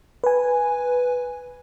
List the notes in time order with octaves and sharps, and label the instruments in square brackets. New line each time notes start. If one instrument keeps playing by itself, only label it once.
[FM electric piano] B4 G#5